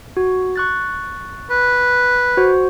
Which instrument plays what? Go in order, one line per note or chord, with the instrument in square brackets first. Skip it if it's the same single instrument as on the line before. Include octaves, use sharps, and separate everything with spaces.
[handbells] F#4
C#6 F#6 A6
[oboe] B4
[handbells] F#4 C5